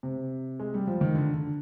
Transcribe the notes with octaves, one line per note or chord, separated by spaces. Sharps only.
C3
G#3
G3
F3
D#3
D3
D3